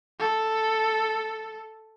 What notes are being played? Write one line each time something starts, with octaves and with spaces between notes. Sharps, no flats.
A4